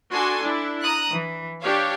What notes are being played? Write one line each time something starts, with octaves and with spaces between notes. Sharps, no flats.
D4 F#4 A4 G#5 C6
D4 E4
A#5 D#6 F#6
E3
D4 G4 C#5 F5